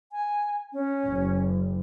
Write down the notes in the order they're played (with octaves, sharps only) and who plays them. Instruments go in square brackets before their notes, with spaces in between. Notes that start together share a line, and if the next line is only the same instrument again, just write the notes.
[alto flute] G#5
C#4
[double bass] F#1